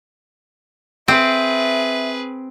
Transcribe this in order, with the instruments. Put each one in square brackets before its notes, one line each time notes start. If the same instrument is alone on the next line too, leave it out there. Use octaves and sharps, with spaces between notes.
[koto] C4 [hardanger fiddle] G#4 B4 [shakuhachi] E5